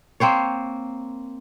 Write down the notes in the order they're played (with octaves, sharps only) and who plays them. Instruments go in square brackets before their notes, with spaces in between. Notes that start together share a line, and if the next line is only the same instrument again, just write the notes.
[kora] A#3 C4 C5 C#5